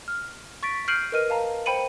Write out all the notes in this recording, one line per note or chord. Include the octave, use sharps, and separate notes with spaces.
F6
C#6 A6 B6 D7
F6 G6 C7 D7 D#7 F#7
A#4 B4 D#5 F6 D#7
F5 A5 A#5
C5 G5 B5 C#7 D#7 F#7